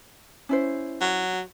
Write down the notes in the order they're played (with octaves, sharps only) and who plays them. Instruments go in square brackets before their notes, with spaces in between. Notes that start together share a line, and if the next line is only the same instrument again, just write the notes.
[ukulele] C#4 E4 C5
[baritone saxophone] F#3
[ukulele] F#4